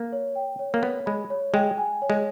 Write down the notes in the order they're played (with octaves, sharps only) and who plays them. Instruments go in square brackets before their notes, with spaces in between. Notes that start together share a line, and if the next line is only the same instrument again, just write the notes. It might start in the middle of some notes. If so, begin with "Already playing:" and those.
Already playing: [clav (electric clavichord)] A#3
[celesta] C#5
G5
C#5
[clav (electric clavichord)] A#3
[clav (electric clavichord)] B3 [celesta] C#5
[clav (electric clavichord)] G#3 [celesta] B5
[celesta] C#5
[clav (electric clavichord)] G#3 [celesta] G5
[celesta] G#5
C#5
[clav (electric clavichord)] G#3